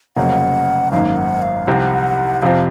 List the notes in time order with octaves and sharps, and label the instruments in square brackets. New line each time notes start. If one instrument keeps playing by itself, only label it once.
[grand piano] F1 F2 C#3 F#3 A#3 [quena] F#5
[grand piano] G#1 F#2 D#3 A#3 [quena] F5
[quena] F#5
F5
[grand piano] C2 C3 F3 C4 [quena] F#5
[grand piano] F2 C3 F3 C4 F4 [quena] F5